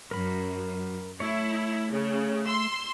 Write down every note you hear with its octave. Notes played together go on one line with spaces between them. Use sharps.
F#2 A#4 B5
A3 E4 C#5
C#3
C6 E6